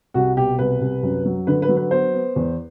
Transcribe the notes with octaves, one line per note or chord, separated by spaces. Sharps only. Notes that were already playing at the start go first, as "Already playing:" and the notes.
C2 F#4
B2 G4
C2 B4
C2
F#2
F#3
D3 B4
B4
F#3
B4
B3 C5
B3
E2